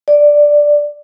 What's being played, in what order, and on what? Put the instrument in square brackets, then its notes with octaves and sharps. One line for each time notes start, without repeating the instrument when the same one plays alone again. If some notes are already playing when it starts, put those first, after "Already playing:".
[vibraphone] D5